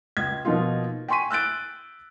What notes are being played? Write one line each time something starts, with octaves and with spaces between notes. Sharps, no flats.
C#2 G#6
B2 F3 A#3 D#4 F4
G5 G#5 C6 C#6 B6 D#7
E6 F#6 G6 A6 D7